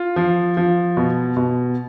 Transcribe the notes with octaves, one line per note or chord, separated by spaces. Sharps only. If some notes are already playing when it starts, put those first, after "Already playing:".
Already playing: F4
F3
F3
B2
B2